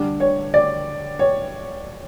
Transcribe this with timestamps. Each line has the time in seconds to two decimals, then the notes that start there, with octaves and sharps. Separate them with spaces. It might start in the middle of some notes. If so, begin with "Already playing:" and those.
Already playing: D3 G3 D4
0.20 C#5
0.54 D5
1.19 C#5